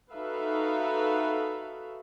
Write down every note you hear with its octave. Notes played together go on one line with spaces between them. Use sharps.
D#4 F#4 A4 B4 E5 F5